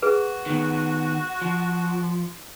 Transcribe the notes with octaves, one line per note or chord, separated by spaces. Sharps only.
F#4 G#4 B4
D#3 B3
F3